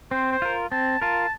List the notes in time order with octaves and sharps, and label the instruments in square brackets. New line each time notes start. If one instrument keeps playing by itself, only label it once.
[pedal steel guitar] C4 [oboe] C5
[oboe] C5
[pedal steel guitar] F4 A#4
[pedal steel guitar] C4 [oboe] A5
[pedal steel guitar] F4 A#4 [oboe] A5